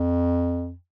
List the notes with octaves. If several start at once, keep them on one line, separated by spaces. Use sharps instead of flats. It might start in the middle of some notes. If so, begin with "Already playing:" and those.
Already playing: F2